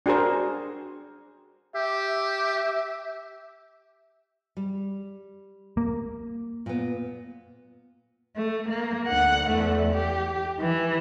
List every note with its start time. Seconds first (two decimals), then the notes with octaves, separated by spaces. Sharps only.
0.06 D4 F#4 G#4 A#4 C5
1.75 G4 E5
4.57 G3
5.77 A#3
6.66 A#2 B3
8.36 A3
8.69 A#3
9.08 D2 F#5
9.51 E2 A3
9.94 G4
10.60 E3